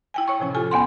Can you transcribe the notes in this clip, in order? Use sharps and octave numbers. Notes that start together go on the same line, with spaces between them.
E4 G5 G#5
C#5 C#6
A2 C3 F3 C#4
F4 G4 A4 G#5
E2 B3 F#5 C6